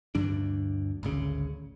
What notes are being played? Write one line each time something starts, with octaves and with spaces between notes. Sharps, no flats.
D2 G2 E3 D4
G#1 D2 C#3